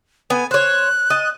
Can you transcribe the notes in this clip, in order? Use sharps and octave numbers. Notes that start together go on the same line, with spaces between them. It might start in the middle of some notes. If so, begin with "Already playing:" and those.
B3 G#5
C5 C#5 F#6
D#5 A5